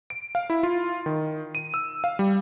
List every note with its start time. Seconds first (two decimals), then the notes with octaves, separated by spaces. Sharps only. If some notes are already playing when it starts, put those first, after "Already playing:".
0.10 D7
0.35 F5
0.50 E4
0.63 F4
1.06 D#3
1.55 D#7
1.74 E6
2.04 F5
2.19 G3